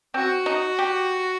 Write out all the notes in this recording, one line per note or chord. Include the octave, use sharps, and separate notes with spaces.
C4 F#4
D#4
G4